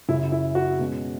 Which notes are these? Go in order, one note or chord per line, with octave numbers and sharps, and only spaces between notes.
F#2 C#3 F#3 C#4 E4
E4
F#4
B2 G#3 C#4